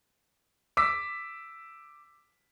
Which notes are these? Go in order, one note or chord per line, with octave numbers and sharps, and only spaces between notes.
D6 E6 B6